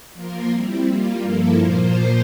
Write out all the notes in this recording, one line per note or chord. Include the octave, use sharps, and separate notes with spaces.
F3 A#3 F4 A#4
G3 C4 E4
G3 A#3 F4
G2 F3 A#3 E4 A4
A#2 F3 A#3 F4 C5